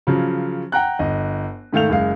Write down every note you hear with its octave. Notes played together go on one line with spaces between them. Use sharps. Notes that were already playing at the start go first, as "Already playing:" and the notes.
C#3 F3 F#3
F#5 G5 A#5 F#6
G1 D#5
G#2 D#3 A3 F5 G6 F7
F#1 G#3 F5